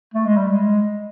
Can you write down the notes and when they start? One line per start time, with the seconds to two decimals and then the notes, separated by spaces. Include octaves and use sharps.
0.14 A3
0.26 G#3
0.36 G3
0.48 G#3